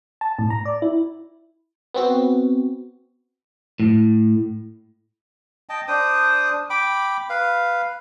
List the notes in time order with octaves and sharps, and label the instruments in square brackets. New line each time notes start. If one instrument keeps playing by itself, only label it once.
[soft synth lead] A5
A2
A#5
D5
E4
[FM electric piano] B3 C4 F#4
[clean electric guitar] A2
[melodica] D#5 G5 A5
D4 C5 D#6
G5 B5 D6
B4 F5